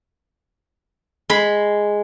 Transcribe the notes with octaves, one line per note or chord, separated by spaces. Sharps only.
G#3 B5